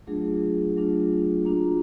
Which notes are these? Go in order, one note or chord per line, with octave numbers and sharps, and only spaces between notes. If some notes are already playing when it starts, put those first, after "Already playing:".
F#3 A3 D4 F4 G#4
F#3 A3 D4 F4
A#3 D4 F4 F#4